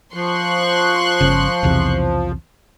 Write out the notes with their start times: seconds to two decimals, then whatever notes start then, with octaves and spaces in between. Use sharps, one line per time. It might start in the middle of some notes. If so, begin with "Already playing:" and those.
0.14 F3 C6 C#6 F#6
1.21 G1 C#3
1.63 B1 E2 C3